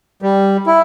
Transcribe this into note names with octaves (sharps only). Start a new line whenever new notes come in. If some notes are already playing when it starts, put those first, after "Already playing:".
G3
E4